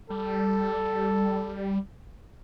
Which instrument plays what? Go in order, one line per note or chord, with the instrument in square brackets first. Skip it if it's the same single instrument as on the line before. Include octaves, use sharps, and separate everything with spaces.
[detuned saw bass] G3 [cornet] A4